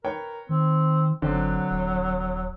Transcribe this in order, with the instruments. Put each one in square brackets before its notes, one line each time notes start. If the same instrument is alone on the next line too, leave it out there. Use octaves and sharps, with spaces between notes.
[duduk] A#4 [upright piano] B4 C#5 G5
[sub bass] D#3 [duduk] C4
[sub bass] G1 [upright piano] D3 C4 [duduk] F#3
[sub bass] D#1